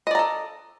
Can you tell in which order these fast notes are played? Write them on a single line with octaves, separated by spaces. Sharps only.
D#5 D5 A#5 A4